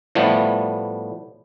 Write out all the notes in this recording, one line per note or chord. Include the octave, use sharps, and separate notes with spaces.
A2 F3 G3 A3 B3